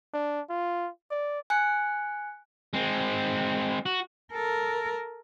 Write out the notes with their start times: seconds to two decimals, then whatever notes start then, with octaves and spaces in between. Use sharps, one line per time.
0.14 D4
0.50 F4
1.11 D5
1.50 G#5 F#6 C#7
2.73 G#3 C4
3.86 F#4
4.33 A4 A#4